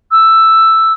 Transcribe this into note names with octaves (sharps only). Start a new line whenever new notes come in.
E6